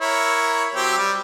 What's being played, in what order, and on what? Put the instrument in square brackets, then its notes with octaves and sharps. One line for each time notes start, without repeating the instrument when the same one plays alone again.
[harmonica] E4 A#4 C#5
F#3 C4 G4
G3